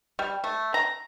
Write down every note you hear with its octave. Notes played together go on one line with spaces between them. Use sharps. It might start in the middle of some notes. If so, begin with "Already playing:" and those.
G3
A3
A#5